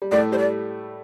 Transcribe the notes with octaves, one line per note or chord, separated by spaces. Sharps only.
G3
A2 A3 D5
G3 C5
D5